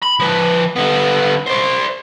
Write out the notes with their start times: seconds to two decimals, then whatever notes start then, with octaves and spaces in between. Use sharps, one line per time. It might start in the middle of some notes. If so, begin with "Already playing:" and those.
0.03 B5
0.20 F3 B4
0.76 D3 B3
1.46 C5 D5